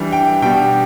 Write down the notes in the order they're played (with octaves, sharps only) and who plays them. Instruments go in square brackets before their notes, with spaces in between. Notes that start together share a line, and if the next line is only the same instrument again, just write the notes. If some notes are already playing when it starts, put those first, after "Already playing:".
Already playing: [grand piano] E3 G3 D4
G5
B2 G3 D4 G5